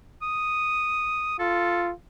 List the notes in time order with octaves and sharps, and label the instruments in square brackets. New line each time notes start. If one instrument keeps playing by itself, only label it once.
[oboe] D#6
[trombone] F4 [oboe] A4